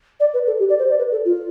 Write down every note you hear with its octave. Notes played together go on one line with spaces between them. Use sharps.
D5
B4
A4
G4
D5
C5
D5
B4
A4
F4